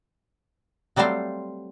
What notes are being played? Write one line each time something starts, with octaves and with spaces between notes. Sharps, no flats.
F#3 G3 A3 C4 C5 F5